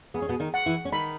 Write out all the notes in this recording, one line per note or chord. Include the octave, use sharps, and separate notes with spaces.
B3 G#4
C#4
B2 B3
D#3 D#4
F#5
E3 E4
C#4
D#3 D#4 B5